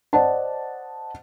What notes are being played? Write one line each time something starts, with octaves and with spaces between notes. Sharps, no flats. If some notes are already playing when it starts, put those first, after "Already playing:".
C5 D5 D#5 F#5 A5